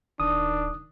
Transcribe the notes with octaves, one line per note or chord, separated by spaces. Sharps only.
D1 D#3 D4 D#6